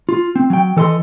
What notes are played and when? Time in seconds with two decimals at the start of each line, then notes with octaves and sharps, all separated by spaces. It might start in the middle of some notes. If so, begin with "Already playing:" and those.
0.09 F4
0.36 C4
0.50 F#3 G5
0.77 E3 A4 D#5 C6